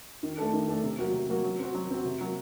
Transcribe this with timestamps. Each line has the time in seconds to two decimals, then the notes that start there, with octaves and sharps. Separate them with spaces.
0.23 D#3
0.38 A3 D4 A4
0.53 D#3
0.68 A3 D4 A4
0.84 C3
0.99 F#3 A#3 F#4
1.13 C3
1.29 F#3 A#3 F#4
1.44 F#3
1.59 C4 F#4
1.75 F#3
1.90 C4 F#4
2.05 C3
2.21 F#3 A#3